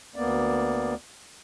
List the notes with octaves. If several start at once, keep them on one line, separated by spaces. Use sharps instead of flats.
D2 A#3 B3 D5